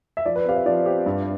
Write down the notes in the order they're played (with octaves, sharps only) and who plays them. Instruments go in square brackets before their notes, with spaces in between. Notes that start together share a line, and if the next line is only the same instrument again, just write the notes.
[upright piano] E5
[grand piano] F3 [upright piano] D5
[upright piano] B4
[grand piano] C4 G4 [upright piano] F5
[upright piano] E5
[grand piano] F3 [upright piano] D5
[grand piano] C4 G4
G2